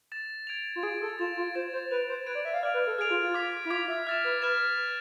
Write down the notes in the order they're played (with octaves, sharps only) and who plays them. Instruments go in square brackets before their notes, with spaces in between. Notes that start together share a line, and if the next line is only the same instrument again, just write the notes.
[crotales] A6 E7
G#6 D7 F7
[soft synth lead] F4
[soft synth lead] G#4 [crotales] G#6 D7 F7
[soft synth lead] A4
[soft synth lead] F4 [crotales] A6 E7
[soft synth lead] F4
[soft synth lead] C5 [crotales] A6 E7
[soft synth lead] C5
[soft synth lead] B4 [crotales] G#6 D7 F7
[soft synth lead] C5
[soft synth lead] B4 [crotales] G#6 D7 F7
[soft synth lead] D5
E5
F5
[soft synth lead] D5 [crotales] F6 G#6 D7 F7
[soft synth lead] B4
A4
[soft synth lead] G#4 [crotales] F6 G#6 D7 F7
[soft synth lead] F4
F4
[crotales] D6 G#6 B6 F7
[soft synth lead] E4
[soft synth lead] F4 [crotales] D6 G#6 B6 F7
[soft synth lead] E5
[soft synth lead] E5 [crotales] F6 A6 E7
[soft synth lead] B4
[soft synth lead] B4 [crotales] F6 A6 E7